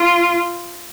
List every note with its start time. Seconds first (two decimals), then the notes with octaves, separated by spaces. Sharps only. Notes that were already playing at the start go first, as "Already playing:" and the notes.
Already playing: F4